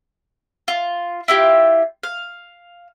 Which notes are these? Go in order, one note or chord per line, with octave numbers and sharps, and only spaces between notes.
F4
E4 F4 G4
F5